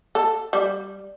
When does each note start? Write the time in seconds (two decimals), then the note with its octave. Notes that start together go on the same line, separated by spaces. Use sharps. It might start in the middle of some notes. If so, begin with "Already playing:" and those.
0.15 A4
0.53 G3